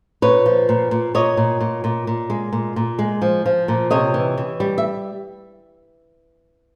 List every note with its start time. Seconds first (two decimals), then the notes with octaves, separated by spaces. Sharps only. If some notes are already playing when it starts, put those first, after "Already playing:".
0.22 A#2 B4 C#5
0.46 F3
0.69 A#2
0.91 A#2
1.15 A#2 C#5 D#5
1.37 A#2
1.61 A#2
1.84 A#2
2.07 A#2
2.30 G#3
2.52 A#2
2.76 A#2
2.99 G#3
3.22 F3
3.46 F3
3.68 A#2
3.91 C3 C#5 D#5
4.14 E3
4.38 E3
4.60 G3
4.78 E5